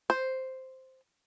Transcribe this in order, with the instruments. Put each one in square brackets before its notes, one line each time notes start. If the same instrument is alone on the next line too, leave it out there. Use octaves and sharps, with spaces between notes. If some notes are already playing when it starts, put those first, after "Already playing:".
[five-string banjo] C5